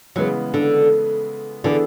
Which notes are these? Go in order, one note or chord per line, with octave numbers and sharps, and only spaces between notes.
C#3 E3 F#3 G#3 B3
D3
D3 E3 B3 D4 G#4